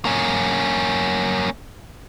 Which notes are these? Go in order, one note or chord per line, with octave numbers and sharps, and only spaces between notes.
A#3 C#4